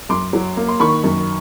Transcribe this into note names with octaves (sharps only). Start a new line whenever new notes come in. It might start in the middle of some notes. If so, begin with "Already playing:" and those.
F#2 C6 D6
F#3
A#3
C6
D#3 B5 C#6
F#2